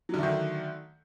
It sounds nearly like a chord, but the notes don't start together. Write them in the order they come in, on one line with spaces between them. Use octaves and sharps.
F#3 D3 A3 D#3